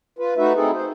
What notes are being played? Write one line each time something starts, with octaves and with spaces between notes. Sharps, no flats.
F4 B4
A3 D#4 F#4 B4 E5
C4 D#4 E4 G#4 A4
C5